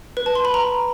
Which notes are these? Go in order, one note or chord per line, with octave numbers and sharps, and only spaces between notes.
B4
A5
C6
B5
A#5